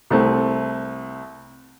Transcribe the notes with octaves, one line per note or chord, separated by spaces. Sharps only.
C2 A3 C4